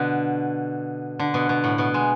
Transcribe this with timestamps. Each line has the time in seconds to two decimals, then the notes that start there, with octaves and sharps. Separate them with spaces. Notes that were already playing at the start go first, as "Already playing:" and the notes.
Already playing: B2 D3
1.19 D3
1.34 B2
1.49 B2
1.64 A2
1.78 B2
1.94 G#3